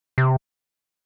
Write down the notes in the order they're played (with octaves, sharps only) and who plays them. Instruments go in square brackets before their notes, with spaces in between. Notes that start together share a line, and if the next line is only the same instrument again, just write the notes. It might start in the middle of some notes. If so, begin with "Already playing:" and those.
[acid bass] C3